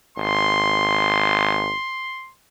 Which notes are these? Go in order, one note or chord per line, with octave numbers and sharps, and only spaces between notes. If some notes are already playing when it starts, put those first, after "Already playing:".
G#1 C6